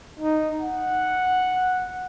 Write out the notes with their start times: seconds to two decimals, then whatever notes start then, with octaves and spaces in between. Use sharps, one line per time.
0.19 D#4
0.62 F#5